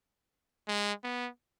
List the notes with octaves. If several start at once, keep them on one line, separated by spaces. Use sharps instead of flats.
G#3
B3